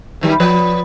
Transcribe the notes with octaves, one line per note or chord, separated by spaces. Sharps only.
F#2 D#3 G3
F3 B4 D5